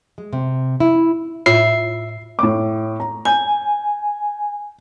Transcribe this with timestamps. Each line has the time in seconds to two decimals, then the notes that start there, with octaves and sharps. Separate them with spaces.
0.18 G#3
0.33 C3
0.80 E4
1.46 A2 F4 E5 C7
2.39 A2 D6
3.00 A#5
3.25 G#5 G6